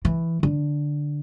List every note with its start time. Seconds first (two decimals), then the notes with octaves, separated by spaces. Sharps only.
0.05 E3
0.43 D3